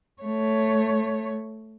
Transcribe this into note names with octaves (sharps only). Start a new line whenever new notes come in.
A3 C#5